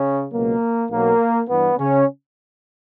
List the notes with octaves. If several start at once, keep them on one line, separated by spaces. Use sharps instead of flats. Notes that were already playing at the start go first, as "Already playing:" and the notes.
Already playing: C#3 C#4
C#2 B2 F#3 A#3
B1 B2 F#3 A#3
G2 E3 G3 B3
C#3 C#4